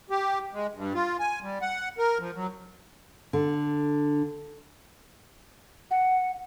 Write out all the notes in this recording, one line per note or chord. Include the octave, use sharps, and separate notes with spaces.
G4
G#3
G2
F4
G#5
G3
F#5
A#4
F3
F#3
D3
F#5